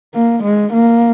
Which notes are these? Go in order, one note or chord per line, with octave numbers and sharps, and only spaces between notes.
A#3
G#3
A#3